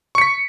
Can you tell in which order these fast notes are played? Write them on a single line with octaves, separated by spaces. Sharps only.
C#6 C#7 B6